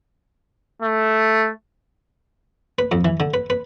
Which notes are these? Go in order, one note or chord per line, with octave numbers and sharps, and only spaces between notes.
A3
B4
F2
E3
D3
B4
B4